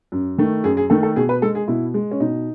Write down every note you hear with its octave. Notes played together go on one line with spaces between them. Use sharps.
F#2
D#3 A3
F#2 G#4
G#4
D#3 A3 A4
A4
B2 G#4
B4
G#3 A4
G#4
B2 E4
G#3
C#4
B2 D#4